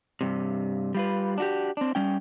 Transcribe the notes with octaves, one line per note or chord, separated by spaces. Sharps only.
G2 C3
G3 F4 B4
D4 F#4 G4
C4 D4
G3 C#4 G5